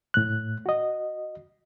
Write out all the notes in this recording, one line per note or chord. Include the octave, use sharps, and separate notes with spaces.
A2 F#6
F#4 D#5